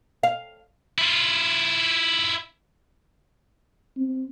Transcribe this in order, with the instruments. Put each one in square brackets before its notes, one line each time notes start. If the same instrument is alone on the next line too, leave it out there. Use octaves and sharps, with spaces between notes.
[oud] F5
[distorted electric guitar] E4 F4
[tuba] C4